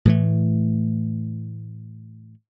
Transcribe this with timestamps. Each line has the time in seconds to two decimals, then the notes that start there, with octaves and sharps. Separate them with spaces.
0.05 A2 E3 A3